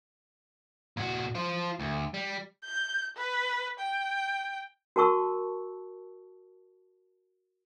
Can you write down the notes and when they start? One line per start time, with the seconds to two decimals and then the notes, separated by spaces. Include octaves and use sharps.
0.97 A#2 F#4
1.35 F4 C5
1.79 D2
2.14 G3
2.64 G6
3.17 B4
3.80 G5
4.96 F#4 A#4 A5 C#6 E6